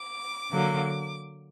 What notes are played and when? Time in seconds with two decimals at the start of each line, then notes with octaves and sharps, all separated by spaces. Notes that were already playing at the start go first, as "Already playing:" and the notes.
Already playing: D6
0.52 D3 F#3 A#3